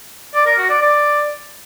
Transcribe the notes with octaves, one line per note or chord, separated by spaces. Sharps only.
D5
A#4
F#4
D5
D5